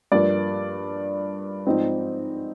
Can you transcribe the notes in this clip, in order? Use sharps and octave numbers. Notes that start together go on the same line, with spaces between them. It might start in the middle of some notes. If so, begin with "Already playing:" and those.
G2 F3 A#3 D5
G#2 F3 C4 D#4